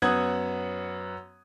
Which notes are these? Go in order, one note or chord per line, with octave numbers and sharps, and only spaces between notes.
F#2 B3 F#5 D#6 G#6